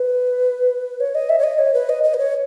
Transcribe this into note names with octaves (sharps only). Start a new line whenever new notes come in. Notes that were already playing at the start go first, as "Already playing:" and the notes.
Already playing: B4
C#5
D#5
E5
C#5
D#5
C#5
B4
D#5
D#5
B4
C#5